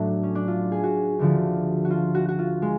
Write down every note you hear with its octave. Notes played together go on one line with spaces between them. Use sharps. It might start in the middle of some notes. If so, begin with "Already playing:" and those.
Already playing: A2 F#3 A3 D4
C#4
D4
F4
G#4
F#4
D2 D3 F3
F#4
F4
F#4
F#4
F4
G#3